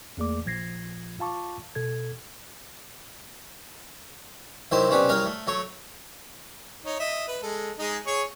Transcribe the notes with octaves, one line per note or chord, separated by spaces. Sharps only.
E2 A3 A#3 G#4 D5 D6
A1 A#2 F3 G#6 A#6 C7
F4 F5 A5 C#6 D6
B2 A4 G#6
C3 D#3 F#3 E4 C5
B1 C3 C#4 D4 B4
C2 F#3 A#4 F5 G5 A#5
A3
F#3 A3 C#5
D#4 C#5
D#5 E5
B4
G#3 A4
G#3 D#4 G#4
G#4 C#5 C#6